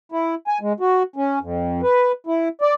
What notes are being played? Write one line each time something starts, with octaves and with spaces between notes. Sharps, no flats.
E4
G#5
G#3
F#4
C#4
F2
B4
E4
D5